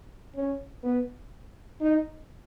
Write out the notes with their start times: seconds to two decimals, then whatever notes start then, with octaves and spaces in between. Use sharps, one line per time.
0.35 C#4
0.83 B3
1.81 D#4